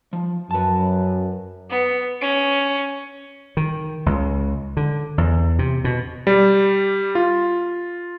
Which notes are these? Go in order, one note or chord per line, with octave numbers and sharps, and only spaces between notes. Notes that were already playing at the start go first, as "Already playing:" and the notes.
F3
F#2 B4 A5
B3
C#4
D#3
C#2
D3
E2
C3
B2
G3
F4